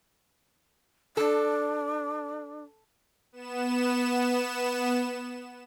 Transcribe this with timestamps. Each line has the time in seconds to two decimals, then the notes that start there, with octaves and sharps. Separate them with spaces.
1.17 D4 A4
3.32 B3 E7